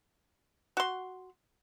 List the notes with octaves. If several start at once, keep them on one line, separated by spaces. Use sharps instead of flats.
F#4 C6